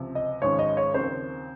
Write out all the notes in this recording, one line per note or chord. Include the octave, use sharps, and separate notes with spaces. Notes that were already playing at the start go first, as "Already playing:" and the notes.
Already playing: C#2 C3 F3
D#5
G#1 G#2 F3 G#3 C#4 C#5
D#5
C#5
D#2 C#3 F3 C4 C5